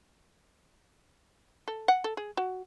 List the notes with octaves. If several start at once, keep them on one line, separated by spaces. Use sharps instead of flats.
A4
F#5
A4
G#4
F#4